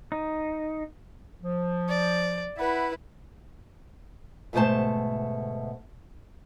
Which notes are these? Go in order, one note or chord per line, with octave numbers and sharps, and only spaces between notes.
D#4
F3
D5
E4 B4 E5 F#5
D2 G#2 B2 A3 C5 A5